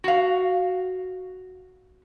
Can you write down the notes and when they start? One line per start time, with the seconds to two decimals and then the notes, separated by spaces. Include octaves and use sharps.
0.04 F#4 F5